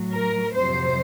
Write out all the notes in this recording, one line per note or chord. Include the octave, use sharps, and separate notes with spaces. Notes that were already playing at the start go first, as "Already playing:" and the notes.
Already playing: A2 F#3
A#4
F2 C3 F#3 C5